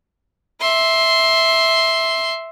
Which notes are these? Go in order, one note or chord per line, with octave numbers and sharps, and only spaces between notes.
E5 C6